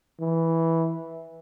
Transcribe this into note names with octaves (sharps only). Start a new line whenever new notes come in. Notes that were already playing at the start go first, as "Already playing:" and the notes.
E3